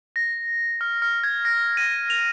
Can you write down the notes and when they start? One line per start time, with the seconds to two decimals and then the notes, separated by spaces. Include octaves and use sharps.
0.16 A#6
0.81 F6
1.02 F6
1.24 G#6
1.45 A#6
1.77 A#6 D#7
2.10 F7